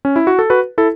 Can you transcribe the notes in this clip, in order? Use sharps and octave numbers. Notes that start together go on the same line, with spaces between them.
C#4
E4
F#4
A4
F#4 B4
E4 A4